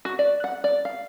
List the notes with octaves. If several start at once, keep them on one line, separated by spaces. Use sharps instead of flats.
F#4
D5
F#5
D5
F5